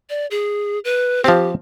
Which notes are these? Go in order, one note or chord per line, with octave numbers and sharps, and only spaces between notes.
D5
G#4
B4
F3 C4 G4